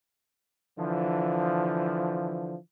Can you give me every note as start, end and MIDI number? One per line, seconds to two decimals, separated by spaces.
0.78 2.57 50
0.78 2.57 52
0.78 2.57 53